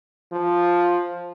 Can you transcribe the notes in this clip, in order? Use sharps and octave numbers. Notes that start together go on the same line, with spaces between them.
F3